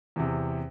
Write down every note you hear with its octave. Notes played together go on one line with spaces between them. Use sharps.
E2 C3